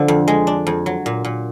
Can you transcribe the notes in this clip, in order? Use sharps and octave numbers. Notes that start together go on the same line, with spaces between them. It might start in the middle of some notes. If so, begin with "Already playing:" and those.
Already playing: D3 F3
F2
G#3
D4
F2
F#3
A#2
A#2